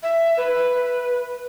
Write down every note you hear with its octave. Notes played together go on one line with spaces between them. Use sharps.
E5
B4